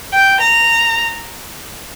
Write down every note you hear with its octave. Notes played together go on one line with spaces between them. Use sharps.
G5
A#5